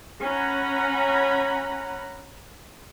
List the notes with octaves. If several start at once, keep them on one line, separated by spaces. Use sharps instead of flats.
C#4 F#5 A#5 B5